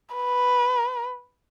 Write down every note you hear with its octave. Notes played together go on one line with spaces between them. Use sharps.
B4